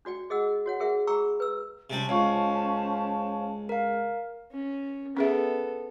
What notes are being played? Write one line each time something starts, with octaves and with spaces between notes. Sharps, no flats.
D4 F#4 D5 G5
G#4 D#5 F#5 E6
F#4 C#5 F#5
G#4 A#4 E5 F#5
G#4 G5 A#5 B5 C#6 E6
B4 E6
C3 G3 C#4 C5 A5
C#2 C#5 F5 C#6
A#4 F5
C#4
B3 C#4 G#4 A4 E5